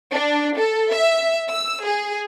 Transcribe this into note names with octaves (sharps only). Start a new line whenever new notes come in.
D4
A4
E5
E6
G#4